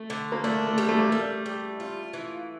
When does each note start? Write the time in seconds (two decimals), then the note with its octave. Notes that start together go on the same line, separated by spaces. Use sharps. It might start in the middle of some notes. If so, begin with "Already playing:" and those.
Already playing: A3
0.10 D3
0.32 A#3
0.44 A3 D4
0.67 A3
0.78 G3
0.89 A3
0.99 A#3
1.09 G3 A3
1.46 G3
1.80 F4
2.14 E3